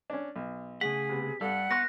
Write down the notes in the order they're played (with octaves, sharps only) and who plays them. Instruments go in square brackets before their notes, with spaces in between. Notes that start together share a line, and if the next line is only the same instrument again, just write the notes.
[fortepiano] C#4 D4
B1
[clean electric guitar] C#3 A3 F#5 [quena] G#4 [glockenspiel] B6
[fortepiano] C3 B3
[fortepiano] G2 A4 D5 [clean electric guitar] G3 [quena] F#5
[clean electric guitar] B3 [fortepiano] C6 C#6 [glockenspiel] F#6 A#6